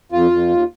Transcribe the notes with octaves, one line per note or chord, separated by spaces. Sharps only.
F2 F4
F2
D#2